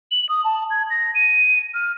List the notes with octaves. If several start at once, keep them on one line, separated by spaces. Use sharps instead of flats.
F#7
D#6
A5
G#6
A#6
D#7
F6